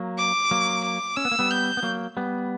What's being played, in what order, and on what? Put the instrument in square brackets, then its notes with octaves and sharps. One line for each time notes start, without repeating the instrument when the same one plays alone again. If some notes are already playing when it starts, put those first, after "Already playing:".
Already playing: [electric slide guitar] F#3 A#3
[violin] D6
[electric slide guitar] F#3 A#3
[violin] D6
[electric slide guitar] C#4 [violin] E6
[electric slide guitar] B3
A#3
G3 B3
[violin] G6
[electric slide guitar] B3
F#3 A#3
G3 B3